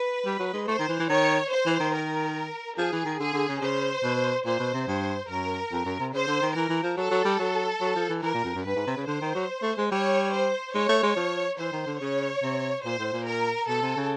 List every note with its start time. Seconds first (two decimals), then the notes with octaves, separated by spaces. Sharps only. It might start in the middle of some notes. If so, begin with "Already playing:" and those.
Already playing: B4
0.26 G3
0.40 F#3
0.53 G#3
0.68 A3 C5
0.79 D#3
0.89 E3
0.99 E3
1.09 D#3 C#5
1.51 C5
1.66 E3
1.80 D#3
1.94 A#4
2.78 F3 G#4
2.92 E3
3.05 D#3
3.20 D3 G#4
3.33 D3
3.48 C#3
3.62 C#3 C5
4.03 B2
4.45 A#2 C5
4.59 B2
4.73 C3
4.87 G2 C5
5.29 F#2 A#4
5.72 F2
5.85 F#2
6.00 C3
6.13 C#3 C5
6.27 D3
6.42 D#3
6.55 E3 A#4
6.69 E3
6.83 F3
6.97 F#3 A4
7.11 F#3
7.25 G3
7.39 F#3
7.81 F#3
7.96 F3
8.09 E3
8.23 E3 A#4
8.34 A#2
8.44 F2
8.55 F#2
8.66 G2 B4
8.76 G#2
8.87 C3
8.97 C#3
9.07 D3 C5
9.21 D#3
9.35 F#3
9.62 A3
9.78 G#3
9.90 G3 C#5
10.33 C5
10.75 G#3 C#5
10.89 A3
11.03 G#3
11.16 F3
11.59 E3 C5
11.72 D#3
11.86 D3
12.01 C#3 C#5
12.43 C3
12.85 A#2 C5
12.99 A2
13.13 A#2
13.27 A#4
13.68 B2 A4
13.82 C3
13.97 C#3